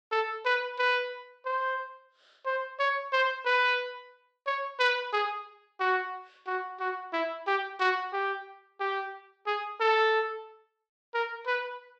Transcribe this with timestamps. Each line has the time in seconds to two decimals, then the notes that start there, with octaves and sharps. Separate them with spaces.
0.12 A4
0.45 B4
0.79 B4
1.46 C5
2.46 C5
2.79 C#5
3.12 C5
3.46 B4
4.47 C#5
4.79 B4
5.13 G#4
5.80 F#4
6.47 F#4
6.80 F#4
7.13 E4
7.47 G4
7.80 F#4
8.13 G4
8.80 G4
9.47 G#4
9.80 A4
11.14 A#4
11.47 B4